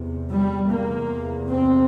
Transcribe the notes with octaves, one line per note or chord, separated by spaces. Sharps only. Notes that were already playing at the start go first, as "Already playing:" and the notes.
Already playing: E2 C3
G3
E2 C3 A#3
C4